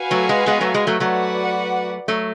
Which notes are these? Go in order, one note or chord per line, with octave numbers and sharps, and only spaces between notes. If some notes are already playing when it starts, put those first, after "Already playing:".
Already playing: F#4 B4 F5 G#5
F#3 A3
G#3
G#3 B3
F#3 A3
G#3
F#3 A3
F#3 A3 F#4 B4 D5 F#5
F#3 A3